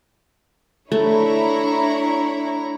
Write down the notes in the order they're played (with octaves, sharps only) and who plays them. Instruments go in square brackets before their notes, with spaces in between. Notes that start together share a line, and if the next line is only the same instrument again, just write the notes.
[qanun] A3 [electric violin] D4 C#5 [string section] E4 A#5